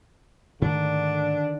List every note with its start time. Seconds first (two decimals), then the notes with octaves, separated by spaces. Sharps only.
0.62 G#2 D3 D#3 A3 D4